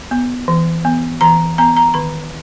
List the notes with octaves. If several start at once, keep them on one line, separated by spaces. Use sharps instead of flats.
B3
E3
B3
E3 A#5
B3 A#5
A#5
D#3 B5